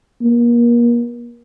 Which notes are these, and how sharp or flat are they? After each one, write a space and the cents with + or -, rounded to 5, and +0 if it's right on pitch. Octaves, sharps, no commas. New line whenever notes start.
A#3 +35